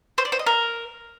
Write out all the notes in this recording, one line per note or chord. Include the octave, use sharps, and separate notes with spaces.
C5
D5
C5
D#5
A#4